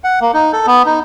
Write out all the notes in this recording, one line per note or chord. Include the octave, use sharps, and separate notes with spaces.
F#5
A#3
D#4
A4
B3
D#4